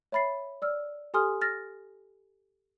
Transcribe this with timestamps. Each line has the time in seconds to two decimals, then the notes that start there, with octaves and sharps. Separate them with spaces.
0.12 C#5 E5 B5 A6 C7
0.62 D5 E6 F6
1.14 G4 A4 G#5 C6 D#6 F6
1.41 F6 A6 A#6